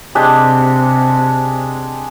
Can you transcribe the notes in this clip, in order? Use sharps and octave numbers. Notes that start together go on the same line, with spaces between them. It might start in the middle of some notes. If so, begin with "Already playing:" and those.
C3 G#3 D4 G4